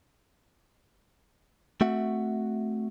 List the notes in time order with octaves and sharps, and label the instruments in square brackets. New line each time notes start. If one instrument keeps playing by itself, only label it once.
[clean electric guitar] A3 C4 F#4 E5 F#5